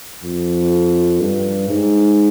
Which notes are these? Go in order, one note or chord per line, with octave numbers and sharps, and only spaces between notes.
F2
G2
G#2